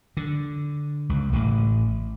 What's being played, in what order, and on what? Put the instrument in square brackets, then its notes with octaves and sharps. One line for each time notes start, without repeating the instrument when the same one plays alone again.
[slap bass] D3
C#2
A1